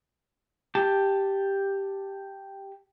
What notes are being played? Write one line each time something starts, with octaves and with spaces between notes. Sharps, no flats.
G4 A5